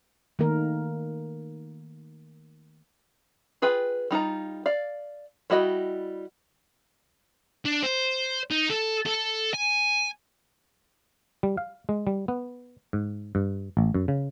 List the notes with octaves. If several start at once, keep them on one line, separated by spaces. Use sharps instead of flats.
D#3 A3 A#3 A#4
F4 G#4 B4 G5
G3 D#4 F4 A#5
D5 F5
G3 E4 F#4 D#5 G5
D4
C5
D#4
A4
A4
G#5
G3
F5
G#3
G3
B3
G#2
G2
A1
F#2
C#3